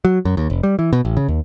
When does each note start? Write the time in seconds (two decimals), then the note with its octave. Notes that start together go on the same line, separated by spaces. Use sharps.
0.05 F#3
0.25 F#2
0.37 D#2
0.50 F1
0.63 G3
0.79 E3
0.93 B2
1.05 A1
1.17 C#3
1.28 D#2